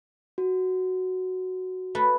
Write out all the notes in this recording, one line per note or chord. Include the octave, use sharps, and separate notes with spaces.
F#4
A3 B4